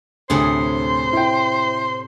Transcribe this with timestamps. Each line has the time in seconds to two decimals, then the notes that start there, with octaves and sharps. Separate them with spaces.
0.30 D2 A2 C3 G#4 C5
1.13 E4 G5